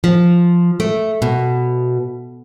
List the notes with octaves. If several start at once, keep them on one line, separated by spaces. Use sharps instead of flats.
F3
A3
B2